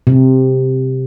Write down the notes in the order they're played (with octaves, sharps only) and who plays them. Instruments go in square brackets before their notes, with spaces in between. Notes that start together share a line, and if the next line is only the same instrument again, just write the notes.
[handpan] C3